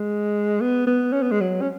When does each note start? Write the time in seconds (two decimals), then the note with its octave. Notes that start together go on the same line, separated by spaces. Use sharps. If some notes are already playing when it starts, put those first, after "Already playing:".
Already playing: G#3
0.60 B3
0.86 B3
1.12 C#4
1.22 B3
1.31 G#3
1.41 F#3
1.61 C#4